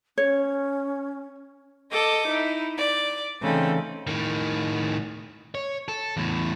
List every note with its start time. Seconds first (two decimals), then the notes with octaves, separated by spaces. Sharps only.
0.18 C#4 C#5
1.92 A4 D#5 D6
2.28 D#4 E4
2.77 D5
3.42 C#3 E3 A3 C4 D#4 A4
4.07 A2 D#3
5.55 C#5
5.88 A4
6.17 E2 A2